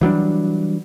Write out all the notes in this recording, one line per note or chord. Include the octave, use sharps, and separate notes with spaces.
E3 F#3 G3 D4